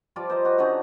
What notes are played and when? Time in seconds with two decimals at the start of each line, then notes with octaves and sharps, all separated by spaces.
0.16 F3 G3 F4 D5
0.30 C5 D#5 A#5
0.45 F#4
0.58 D3 C#4 D#4 F#4